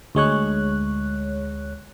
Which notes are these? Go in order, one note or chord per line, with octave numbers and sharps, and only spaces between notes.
D2 G#3 C#5 F#6